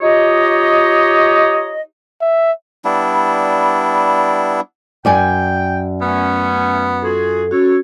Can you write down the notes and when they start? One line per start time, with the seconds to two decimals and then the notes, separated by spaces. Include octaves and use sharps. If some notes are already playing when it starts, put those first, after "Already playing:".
0.01 D#4 F4 G4 C#5 D#5
2.21 E5
2.85 G3 B3 D4 E4
5.05 F#2 D5 G5 G#5
6.01 A3 B3 C#4
7.02 F4 F#4 G#4 A4
7.51 C#4 F#4 A4 C#5